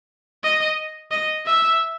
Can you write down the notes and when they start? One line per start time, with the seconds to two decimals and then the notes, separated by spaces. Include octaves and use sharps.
0.44 D#5
1.12 D#5
1.47 E5